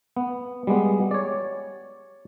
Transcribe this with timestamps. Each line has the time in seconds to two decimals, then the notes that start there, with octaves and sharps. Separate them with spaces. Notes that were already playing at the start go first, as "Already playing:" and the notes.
0.17 B3
0.67 G3 G#3 B3
1.11 C#5 D5